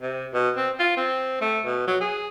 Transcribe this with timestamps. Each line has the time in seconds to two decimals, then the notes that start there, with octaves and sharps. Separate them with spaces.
0.01 C3
0.34 B2
0.57 C4
0.79 F4
0.97 C4
1.41 A3
1.65 B2
1.87 F#3
2.01 G#4